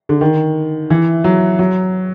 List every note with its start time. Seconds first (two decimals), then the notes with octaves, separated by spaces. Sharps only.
0.09 D3
0.21 D#3
0.90 E3
1.24 F#3
1.59 F#3